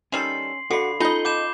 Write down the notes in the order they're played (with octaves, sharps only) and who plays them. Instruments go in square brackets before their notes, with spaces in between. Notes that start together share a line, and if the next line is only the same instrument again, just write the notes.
[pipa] D#3 G3 A4 [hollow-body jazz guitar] C#4 [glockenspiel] C6 C7 F#7
[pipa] D3 [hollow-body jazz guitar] F#4 [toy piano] A4 F5 [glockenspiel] B5 C7
[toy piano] C#4 F4 [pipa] D#4 D#5 [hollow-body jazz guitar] A4 [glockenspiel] B5 G6 G7
[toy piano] F5 A5 [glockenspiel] D6 G6 E7